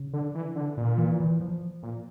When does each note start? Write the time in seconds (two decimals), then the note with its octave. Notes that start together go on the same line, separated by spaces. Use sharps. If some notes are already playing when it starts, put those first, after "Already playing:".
Already playing: C#3
0.13 D3
0.35 E3
0.56 D3
0.77 A#2
0.98 E3
1.20 E3
1.41 F3
1.83 A#2